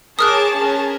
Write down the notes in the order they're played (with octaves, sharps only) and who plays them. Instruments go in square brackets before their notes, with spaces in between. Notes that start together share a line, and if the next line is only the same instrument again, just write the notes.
[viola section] G#4 C#5 A5 [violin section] A#4 D6 [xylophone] D#6 F6 F#6
[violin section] C#4 A#4 B4